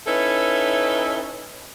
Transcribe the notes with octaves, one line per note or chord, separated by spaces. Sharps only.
C#4 D#4 E4 A4 B4